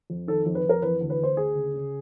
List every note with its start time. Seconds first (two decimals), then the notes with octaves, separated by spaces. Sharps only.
0.10 F2
0.28 D#3 A4
0.46 F2
0.55 B4
0.64 F2
0.69 A#4
0.82 E3 B4
1.01 D2
1.10 B4
1.19 D2 C5
1.37 D2 G#4
1.55 C#3
1.74 C#3